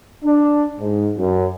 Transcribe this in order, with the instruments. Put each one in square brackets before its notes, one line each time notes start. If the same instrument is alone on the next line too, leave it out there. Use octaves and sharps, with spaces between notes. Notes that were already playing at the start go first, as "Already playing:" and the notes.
[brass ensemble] D4
G#2
F#2